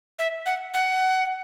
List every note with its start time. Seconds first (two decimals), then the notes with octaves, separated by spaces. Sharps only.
0.19 E5
0.46 F#5
0.74 F#5